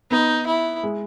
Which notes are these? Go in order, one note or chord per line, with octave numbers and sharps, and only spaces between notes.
B3 D#4
E4
G#3